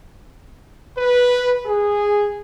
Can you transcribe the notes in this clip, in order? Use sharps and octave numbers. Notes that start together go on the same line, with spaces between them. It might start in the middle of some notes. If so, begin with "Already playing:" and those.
B4
G#4